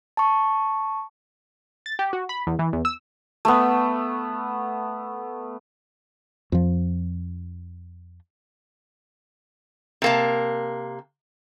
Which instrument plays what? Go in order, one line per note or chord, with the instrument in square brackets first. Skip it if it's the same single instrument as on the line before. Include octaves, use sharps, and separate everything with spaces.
[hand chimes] A5 C#6
[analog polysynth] A6
G4
F#4
B5
E2
E3
E2
E6
[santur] A3 B3
[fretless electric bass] F2 F3
[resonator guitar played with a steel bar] C3 A#3 A5